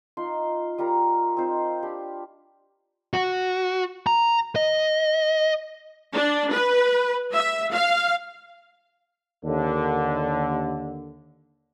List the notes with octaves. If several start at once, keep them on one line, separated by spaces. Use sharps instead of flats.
D#4 F4 C6
G3 F4 A#4 A#5
C4 D#4 F4 C5
D4 G4 B5
F#4
A#5
D#5
D4
B4
E5
F5
D#2 D3